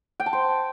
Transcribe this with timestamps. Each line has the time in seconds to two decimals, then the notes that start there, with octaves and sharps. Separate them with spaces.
0.20 G5
0.26 A5
0.33 C5